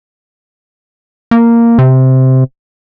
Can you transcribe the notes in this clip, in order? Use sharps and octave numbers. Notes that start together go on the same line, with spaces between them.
A#3
C3